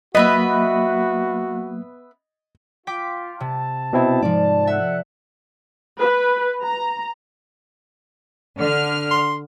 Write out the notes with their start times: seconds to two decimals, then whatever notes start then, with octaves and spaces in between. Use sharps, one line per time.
0.15 F#3 A#3 B3 F#4 B4 D#5 E5
2.87 F4 G5 D6 B6
3.40 C3 A5
3.93 B2 C4 E4
4.22 G#2 F3 D5
4.67 A4 E5 F#5
6.00 B4
6.64 A#5
8.58 D3 F6
9.11 C6